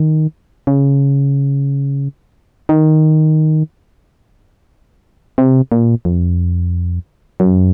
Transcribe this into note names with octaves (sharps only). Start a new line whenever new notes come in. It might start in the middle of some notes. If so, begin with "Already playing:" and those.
Already playing: D#3
C#3
D#3
C3
A#2
F2
F#2